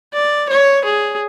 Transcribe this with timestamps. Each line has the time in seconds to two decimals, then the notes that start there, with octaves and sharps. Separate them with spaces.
0.13 D5
0.49 C#5
0.85 G#4